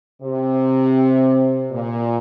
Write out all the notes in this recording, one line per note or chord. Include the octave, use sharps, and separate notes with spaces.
C3
A#2